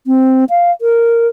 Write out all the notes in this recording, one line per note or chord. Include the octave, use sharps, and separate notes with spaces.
C4
F5
A#4